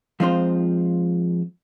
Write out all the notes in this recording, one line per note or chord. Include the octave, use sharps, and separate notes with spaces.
F3 G#3 C4 D#4 F4 C5